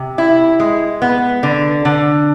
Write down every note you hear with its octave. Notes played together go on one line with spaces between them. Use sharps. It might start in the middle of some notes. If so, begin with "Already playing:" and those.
Already playing: C3
E4
G#3
B3
D3
D3